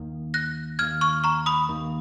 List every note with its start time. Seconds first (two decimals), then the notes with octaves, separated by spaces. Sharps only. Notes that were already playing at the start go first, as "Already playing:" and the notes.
Already playing: D#2 D#3 A#3
0.34 F#6 A#6
0.79 D#2 D#3 A#3 F6 G#6
1.01 C#6 F6
1.24 A#5 C#6
1.46 B5 D#6
1.68 D#2 D#3 A#3